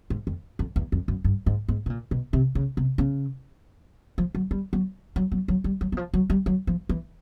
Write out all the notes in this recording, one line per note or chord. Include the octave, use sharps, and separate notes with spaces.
G#2
F2
F2
E2
F2
F#2
G2
G#2
G#2
B2
A#2
B2
C3
C#3
C3
C#3
F3
F#3
G3
F#3
F#3
F#3
F#3
G3
F#3
E3
F3
F#3
G3
F#3
F3
E3